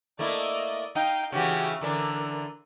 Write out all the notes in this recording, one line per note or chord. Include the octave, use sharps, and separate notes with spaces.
A3 A#3 E4 D5 D#5
D#4 F5 G5
C#3 E3 F#4 G4
D3 E3 D4 A#4